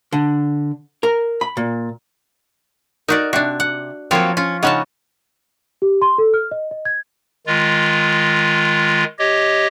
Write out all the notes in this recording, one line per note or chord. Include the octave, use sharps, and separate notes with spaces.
D3
A#4
B5
A#2
D#4 F#4 A#4 D5
C3 D4 F#4
F#5
F3 F#3 A#3 C4 F4 C#5
C#4 F4
C#3 G#3 C#4 D#4 F#5 A5
G4
C6
A4
F6
D#5
D#5
G#6
D#3 G#3 F4
G4 C#5 D#5